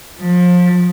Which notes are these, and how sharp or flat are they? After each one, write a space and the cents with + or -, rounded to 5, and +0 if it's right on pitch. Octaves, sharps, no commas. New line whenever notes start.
F3 +30